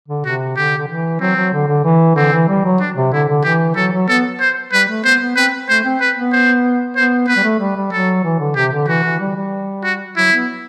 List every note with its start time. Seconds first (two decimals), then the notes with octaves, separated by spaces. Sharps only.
0.08 D3
0.25 C3 F#4
0.57 D3 G4
0.78 D3
0.88 E3
1.20 F#3 C4
1.37 F#3
1.53 D3
1.68 D3
1.85 E3
2.16 D3 C4
2.33 E3
2.49 G3
2.64 F#3
2.80 D4
2.96 C3
3.13 D3 E4
3.28 D3
3.44 E3 G4
3.76 F#3 A4
3.93 F#3
4.09 B3 A4
4.40 C5
4.72 G3 B4
4.88 A3
5.04 B3 C5
5.20 B3
5.36 C4 B4
5.69 A3 C5
5.84 C4
6.01 B4
6.16 B3
6.32 C5
6.96 B3 C5
7.28 B3 B4
7.36 G3
7.43 A3
7.60 G3
7.76 G3
7.92 F#3 A4
8.24 E3
8.39 D3
8.56 C3 G4
8.72 D3
8.88 E3 F#4
9.04 E3
9.20 G3
9.35 G3
9.84 F#4
10.16 F#3 E4
10.32 B3